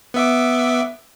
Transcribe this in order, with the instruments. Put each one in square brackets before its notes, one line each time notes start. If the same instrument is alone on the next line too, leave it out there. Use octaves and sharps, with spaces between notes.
[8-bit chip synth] B3 E5 D6